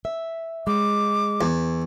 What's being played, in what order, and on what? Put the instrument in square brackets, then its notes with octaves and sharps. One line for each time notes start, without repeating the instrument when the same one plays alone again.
[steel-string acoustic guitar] E5
[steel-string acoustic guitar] G#3 [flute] D6
[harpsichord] E2